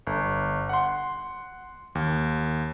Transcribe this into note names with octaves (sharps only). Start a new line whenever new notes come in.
G1
F#5 C6
D#2